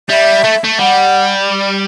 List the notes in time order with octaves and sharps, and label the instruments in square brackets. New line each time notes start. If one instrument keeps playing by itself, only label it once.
[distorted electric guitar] G3 [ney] E5
[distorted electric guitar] A3
A3
[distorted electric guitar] G3 [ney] F#5